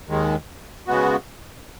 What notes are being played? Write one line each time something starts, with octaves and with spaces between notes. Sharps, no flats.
D#2 D#3 G#3
C#3 G#3 B3 F#4